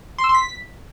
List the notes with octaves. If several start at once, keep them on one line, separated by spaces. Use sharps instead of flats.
C6
E6
C6
B6